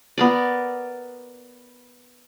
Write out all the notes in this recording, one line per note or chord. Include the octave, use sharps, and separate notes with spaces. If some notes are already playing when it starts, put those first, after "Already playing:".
B3 A#4 D5